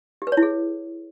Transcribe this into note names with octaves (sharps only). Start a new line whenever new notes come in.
G4
B4
C#5
E4
G#4